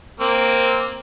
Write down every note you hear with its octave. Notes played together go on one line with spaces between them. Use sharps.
A#3 C4